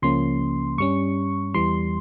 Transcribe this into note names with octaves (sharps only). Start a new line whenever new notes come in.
C#2 C#3 F3 A#3 C#4 C6
G2 G3 C#4 C#6
E2 E3 G3 C6